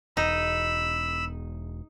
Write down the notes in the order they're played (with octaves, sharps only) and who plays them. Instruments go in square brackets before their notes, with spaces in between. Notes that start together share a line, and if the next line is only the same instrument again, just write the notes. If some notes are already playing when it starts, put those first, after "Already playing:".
[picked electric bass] E1 [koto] D#4 [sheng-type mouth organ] B5 E6